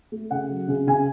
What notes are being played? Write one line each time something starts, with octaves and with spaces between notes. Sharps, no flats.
A3
C#3 F#5
F#3
C#3
C#3 G#5